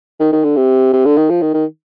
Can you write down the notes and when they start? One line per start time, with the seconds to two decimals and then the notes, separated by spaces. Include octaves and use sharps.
0.20 D#3
0.32 D#3
0.44 D3
0.57 C3
0.93 C3
1.05 D3
1.17 D#3
1.30 F3
1.42 D#3
1.54 D#3